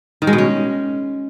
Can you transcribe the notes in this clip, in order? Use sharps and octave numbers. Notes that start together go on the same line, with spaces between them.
D#3
G#3
B2
C#4